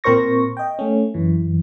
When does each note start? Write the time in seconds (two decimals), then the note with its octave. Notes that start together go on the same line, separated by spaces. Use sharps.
0.04 A#2 C4 A#4 C5 C#6 A#6
0.57 D#5 G5
0.79 A3 C#4
1.14 F#2 E3